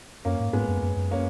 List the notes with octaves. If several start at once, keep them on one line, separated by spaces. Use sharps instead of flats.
F#2 A#3 C#4
G#2
G#2 G#3 B3
F#2
F#2
F#2
A#3 C#4